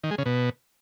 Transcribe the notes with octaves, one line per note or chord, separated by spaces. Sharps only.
D#3
G#3
C#3
B2